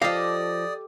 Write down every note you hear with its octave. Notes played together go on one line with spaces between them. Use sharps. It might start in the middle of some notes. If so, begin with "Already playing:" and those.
F3 G4 A4 D5 D#5 F5 D#6 A#6